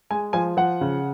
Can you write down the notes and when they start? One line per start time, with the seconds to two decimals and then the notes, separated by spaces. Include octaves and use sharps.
0.10 G#3 G#5
0.33 F3 G#5
0.57 F3 F#5
0.81 C#3